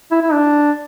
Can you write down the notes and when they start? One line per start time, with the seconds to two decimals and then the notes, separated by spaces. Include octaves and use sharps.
0.11 E4
0.22 E4
0.33 D4